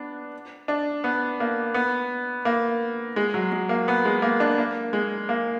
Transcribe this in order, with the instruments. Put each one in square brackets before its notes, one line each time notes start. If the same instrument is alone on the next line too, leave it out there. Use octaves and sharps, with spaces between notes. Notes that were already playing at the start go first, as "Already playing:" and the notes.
Already playing: [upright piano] B3 D4
D4
B3
A#3
B3
A#3
G#3
F#3
G#3
A#3
B3
G#3
A#3
D4
A#3
G#3
A#3